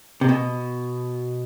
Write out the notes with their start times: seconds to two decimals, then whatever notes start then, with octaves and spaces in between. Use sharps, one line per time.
0.21 C3
0.29 B2